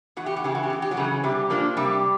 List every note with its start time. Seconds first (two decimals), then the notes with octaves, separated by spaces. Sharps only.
0.17 E2 F#4
0.26 G4
0.36 F#4
0.44 C#3 E3 G4
0.55 F#4
0.63 G4
0.70 E2 F#4
0.82 G4
0.91 F#3 F#4
0.97 C#3 E3
1.24 C3 G3 G4
1.50 F3 A#3 D4
1.77 C3 G3 G4